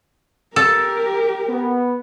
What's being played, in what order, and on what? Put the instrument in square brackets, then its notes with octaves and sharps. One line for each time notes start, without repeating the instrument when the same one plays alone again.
[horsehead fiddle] G4 A#4 [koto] A4
[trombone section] B3